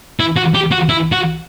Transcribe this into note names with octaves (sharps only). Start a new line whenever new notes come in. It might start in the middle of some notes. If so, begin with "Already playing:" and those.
E4
F#4
G4
F#4
E4
F#4